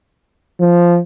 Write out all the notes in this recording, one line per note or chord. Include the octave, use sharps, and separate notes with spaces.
F3